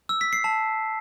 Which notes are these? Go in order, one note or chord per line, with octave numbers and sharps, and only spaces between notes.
E6
B6
C7
A5